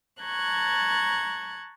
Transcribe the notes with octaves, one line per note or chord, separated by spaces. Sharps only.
A5 A#5 C#6 F#6 G#6